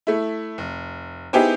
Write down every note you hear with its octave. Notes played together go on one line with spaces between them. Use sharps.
A3 E4
F1
B3 D#4 E4 G4 G#4 C5